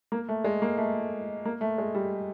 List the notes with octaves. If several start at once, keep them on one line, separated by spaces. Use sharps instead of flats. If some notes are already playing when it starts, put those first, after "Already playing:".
A#3
A3
G#3
A#3
A3
A#3
A3
G#3
G3